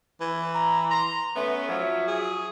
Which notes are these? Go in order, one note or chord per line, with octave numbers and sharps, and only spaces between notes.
E3
A#5
A#5 C6
A3 B3 C#4 E5
F3 F#3
G#4